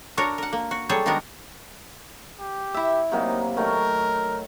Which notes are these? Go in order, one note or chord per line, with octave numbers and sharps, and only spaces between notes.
D4 F#4 A#4 C#5
A#4 F#5
A#3
F#4
F#3 G3 G#4 A4 C#5
D#3 G#3 B3 D4 F#4 A#4
G4
E4 E5
C3 F#3 A#3 D#4
D#3 F#3 A3 A#4